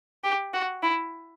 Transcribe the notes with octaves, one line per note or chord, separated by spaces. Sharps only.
G4
F#4
E4